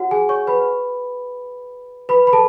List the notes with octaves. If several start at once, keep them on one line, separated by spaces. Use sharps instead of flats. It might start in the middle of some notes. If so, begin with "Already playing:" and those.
Already playing: F#4 C#5 F#5
G#4 G#5
C#5 C#6
B4 B5
B4 B5
B5
A4 A5